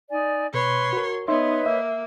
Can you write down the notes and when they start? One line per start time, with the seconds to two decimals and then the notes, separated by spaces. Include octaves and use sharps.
0.11 D#4 D5 G#5
0.54 B2 B4 C#5 C6
0.93 F#4 A#4
1.28 B3 D#4 B4 C#5 D#5 E5 C6
1.66 A#3 E5